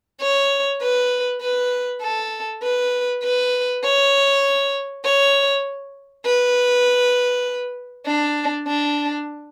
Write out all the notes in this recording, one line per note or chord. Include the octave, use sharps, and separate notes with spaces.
C#5
B4
B4
A4
B4
B4
C#5
C#5
B4
D4
D4